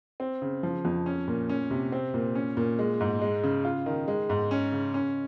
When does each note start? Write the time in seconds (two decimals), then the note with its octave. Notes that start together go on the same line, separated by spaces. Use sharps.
0.20 C4
0.42 C#3
0.63 F3
0.85 F2
1.06 C#4
1.28 A#2
1.49 C#4
1.70 C3
1.92 C4
2.14 A#2
2.35 C#4
2.57 A#2
2.79 G#3
3.00 G#2
3.21 G#3
3.44 C#3
3.65 F4
3.86 D#3
4.08 G#3
4.30 G#2
4.51 C#4
4.72 C#3
4.94 C#4